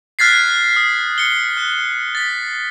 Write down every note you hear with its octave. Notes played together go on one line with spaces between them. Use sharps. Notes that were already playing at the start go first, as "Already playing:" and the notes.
F6 F#6 G#6 A6 B6 C7
D#6
C#7 G7
F#6
A6 B6